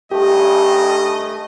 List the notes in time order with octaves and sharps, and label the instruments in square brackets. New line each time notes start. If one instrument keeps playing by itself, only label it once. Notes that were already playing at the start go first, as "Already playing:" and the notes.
[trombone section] G#1 G2 [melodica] A3 [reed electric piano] G4 [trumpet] D#5